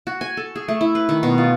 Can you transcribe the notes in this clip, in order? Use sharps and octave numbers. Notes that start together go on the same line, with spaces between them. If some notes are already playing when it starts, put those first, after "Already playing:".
F#4
G#5
A4
G#4
A3
E4
B4
D#3
B2
F4